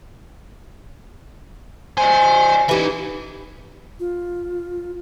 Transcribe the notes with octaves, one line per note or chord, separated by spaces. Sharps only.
C5 D5 D#5 G#5
E3 D#4 G4 E5
F4